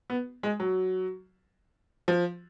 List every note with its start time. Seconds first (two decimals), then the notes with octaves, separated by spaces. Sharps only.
0.10 B3
0.43 G#3
0.60 F#3
2.08 F3